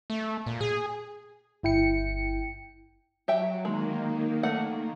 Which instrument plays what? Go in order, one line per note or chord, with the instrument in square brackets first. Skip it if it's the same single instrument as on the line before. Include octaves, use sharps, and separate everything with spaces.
[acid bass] A3
A#2
G#4
[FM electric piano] G1 E4 G5 C#7
[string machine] F#3 [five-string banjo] G4 E5 G5
[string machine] D#3 A#3 [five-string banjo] G#3
[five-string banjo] A3 F#5